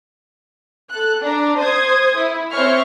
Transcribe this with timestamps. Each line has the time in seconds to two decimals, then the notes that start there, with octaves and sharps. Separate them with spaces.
0.90 A4 F#6
1.21 D4 A#5
1.57 C5 D#6 G#6
2.17 E4
2.51 C4 C5 C#5 E5 C#6 F6